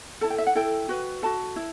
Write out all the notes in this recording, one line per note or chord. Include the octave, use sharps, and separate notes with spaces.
E4 A4 A5
G5
E5
F#5
E4 A4 G5
F#4 B4
F#4 A4 A5
E4